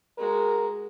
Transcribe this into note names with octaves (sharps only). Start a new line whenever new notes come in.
G#3 F#4 A#4